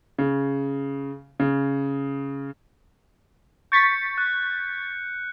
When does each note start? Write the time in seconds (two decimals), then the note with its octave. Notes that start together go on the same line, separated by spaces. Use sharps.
0.18 C#3
1.40 C#3
3.72 C#6 G6 A6 B6 C#7
4.18 F#6